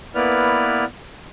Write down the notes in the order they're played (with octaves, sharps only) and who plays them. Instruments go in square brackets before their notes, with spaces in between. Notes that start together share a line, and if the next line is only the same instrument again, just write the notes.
[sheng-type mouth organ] A#3 B3 E4 B4 D5 F6